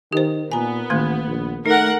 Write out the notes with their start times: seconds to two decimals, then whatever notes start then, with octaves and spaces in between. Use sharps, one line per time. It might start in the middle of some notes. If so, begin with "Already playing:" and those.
0.13 D#3 G4 C5
0.52 A#2 B3 G#5 A#5
0.90 A1 D#3 A3 A#3
1.27 A#1
1.66 A3 D#4 A#4 F#5